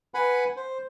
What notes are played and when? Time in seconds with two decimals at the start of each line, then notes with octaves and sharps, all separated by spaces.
0.14 B4 F#5 G#5 B5
0.56 C5